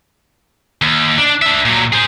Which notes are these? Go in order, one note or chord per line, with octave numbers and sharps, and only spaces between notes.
D#2
D4
D4 E5
A#2 F#3
G#4 C5